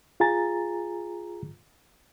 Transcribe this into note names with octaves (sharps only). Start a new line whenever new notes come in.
F4 G#4 G#5 A#5 A6